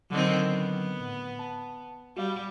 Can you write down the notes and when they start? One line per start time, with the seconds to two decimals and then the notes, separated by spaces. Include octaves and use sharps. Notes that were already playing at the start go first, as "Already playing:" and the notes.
0.10 D3 D#3 F#3 C4
0.47 B3
1.00 A2
1.39 A5
2.17 G3 F#4 F5